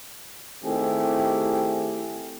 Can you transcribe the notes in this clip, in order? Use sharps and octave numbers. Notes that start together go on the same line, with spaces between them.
D#3 A3 C4 E4 G4 G#4